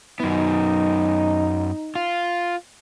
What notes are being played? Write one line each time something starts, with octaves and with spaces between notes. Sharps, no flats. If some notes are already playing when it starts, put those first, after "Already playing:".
F#2 B3 D#4
F4